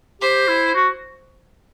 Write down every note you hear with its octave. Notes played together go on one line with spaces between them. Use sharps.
G4 C5
E4
F#4